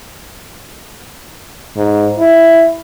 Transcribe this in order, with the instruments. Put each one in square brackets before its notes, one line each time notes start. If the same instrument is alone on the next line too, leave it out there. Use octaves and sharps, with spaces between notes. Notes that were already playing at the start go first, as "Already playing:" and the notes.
[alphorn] G#2
E4